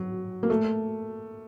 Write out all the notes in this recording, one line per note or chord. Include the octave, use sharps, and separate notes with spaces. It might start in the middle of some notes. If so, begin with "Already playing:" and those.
Already playing: F#3
A#3
A3